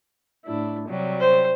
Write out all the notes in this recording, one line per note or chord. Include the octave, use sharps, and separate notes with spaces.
A2 D4 E4
C3 F#3 G3
C5